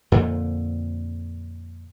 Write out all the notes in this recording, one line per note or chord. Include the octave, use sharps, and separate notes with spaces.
F2 A#2 D3 F3